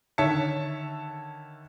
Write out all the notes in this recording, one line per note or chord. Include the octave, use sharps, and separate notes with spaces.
D3 D#3 C#5 E5 A5 C#7